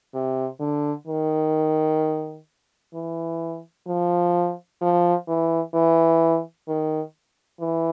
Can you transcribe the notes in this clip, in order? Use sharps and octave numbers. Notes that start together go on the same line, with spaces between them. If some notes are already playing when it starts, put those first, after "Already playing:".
C3
D3
D#3
E3
F3
F3
E3
E3
D#3
E3